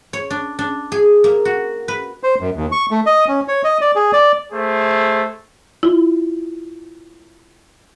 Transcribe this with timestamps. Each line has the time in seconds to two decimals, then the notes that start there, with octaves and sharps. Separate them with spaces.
0.13 C#5
0.30 D4
0.59 D4
0.92 G#4
1.24 A#3
1.45 F#4
1.88 B4
2.23 C5
2.41 F#2
2.56 D#2
2.72 C#6
2.91 A3
3.06 D#5
3.28 C#4
3.48 C#5
3.64 D#5
3.81 D5
3.96 G#4
4.13 D5
4.53 A3 G#4 C5
5.83 E4 F4